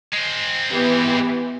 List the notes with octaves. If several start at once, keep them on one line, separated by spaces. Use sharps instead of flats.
G#3 C4
E3 B3 G4